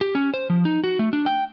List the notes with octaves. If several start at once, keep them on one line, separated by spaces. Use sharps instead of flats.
G4
C#4
C5
F3
D#4
F#4
A3
D4
G5